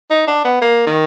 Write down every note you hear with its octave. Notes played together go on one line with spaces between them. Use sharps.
D#4
D4
B3
A#3
D#3